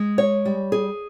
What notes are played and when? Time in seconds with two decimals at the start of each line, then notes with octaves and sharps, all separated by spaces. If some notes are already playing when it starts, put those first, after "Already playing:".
Already playing: G#3
0.18 C#5
0.45 G3
0.72 G#4